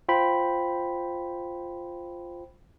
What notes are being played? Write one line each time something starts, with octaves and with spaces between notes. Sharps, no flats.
F4 C5 G5 B5